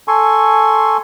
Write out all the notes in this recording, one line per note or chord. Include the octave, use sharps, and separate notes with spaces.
A4 G#5 C6 C#6